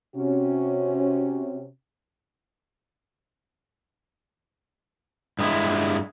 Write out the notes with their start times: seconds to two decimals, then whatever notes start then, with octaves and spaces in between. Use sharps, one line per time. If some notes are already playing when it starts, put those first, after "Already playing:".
0.16 C3 C#4 F#4
5.39 G2 G#3 E4